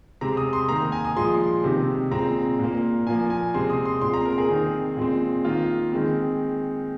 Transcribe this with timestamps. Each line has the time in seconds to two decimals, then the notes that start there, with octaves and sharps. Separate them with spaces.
0.21 C3 G#3 C4 A#5
0.37 D#6
0.53 C6
0.69 D#3 A#3 A#5
0.92 G#5
1.05 D#6
1.16 A#2 F3 G#3 C6
1.64 C3 D#3 C4
2.11 A#2 G#3 C4 A#5
2.59 A#2 A#3
3.06 A#2 F3 A#3 G#5
3.30 G#5
3.54 C3 G#3 C4 C6
3.70 D#6
3.85 C6
4.01 A#2 G#3 C4 C6
4.14 A#5
4.25 A#4
4.38 G#4
4.49 D#3 C4
4.97 A#2 G#3 C4
5.44 D#3 A#3 F4
5.92 D#3 G#3 C4